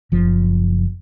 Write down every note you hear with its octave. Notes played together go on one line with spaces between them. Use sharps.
F#1 F3